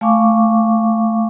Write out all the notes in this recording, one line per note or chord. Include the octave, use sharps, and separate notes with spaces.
A3 F5 G#5 C#6 D6